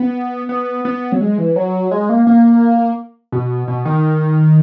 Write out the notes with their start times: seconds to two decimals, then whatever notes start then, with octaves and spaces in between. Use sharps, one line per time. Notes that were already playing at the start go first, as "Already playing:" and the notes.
Already playing: B3
0.49 B3
0.85 B3
1.12 F#3
1.21 G#3
1.38 E3
1.56 F#3
1.91 G#3
2.09 A#3
2.27 A#3
3.32 B2
3.68 B2
3.85 D#3